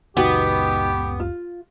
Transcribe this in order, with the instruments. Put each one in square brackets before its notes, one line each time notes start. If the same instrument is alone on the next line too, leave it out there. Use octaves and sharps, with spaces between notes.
[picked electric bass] F#1 C#2 [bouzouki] B3 [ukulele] D#4 F#4 G5 [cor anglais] G4
[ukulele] F4